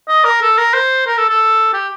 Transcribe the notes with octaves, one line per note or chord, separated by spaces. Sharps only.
D#5
A#4
A4
A#4
C5
A#4
A4
A4
G4